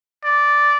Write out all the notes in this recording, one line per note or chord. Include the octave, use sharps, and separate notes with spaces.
D5